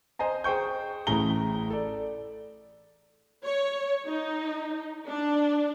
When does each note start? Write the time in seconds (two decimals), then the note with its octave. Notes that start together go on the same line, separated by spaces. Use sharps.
0.19 C5 D#5 G#5 A#5
0.44 G#4 C5 G5 C#6 G6
1.07 A1 A3 E4 G#4 A#5 G7
1.70 A4 D5
3.45 C#5
4.07 D#4
5.06 D4